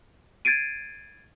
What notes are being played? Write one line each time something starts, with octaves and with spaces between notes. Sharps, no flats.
G#6 A6 C7 D7 D#7